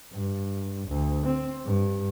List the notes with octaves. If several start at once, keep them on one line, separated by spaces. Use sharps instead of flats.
G2
D2
C4
G2